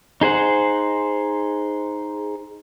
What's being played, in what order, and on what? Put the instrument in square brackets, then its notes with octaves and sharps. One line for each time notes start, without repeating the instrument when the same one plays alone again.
[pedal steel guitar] D#4 G#4 C5 F#5